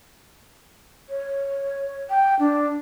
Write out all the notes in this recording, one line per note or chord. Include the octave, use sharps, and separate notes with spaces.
C#5
G5
D4